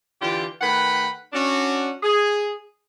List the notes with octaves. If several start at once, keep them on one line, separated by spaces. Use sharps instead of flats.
D3 E3 F4 G4
D#3 A3 B4 F#5 G5 B5
C#4 D4 F#4
G#4